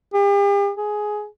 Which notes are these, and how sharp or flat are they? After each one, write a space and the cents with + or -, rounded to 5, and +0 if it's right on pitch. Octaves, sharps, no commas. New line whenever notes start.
G4 +45
G#4 +10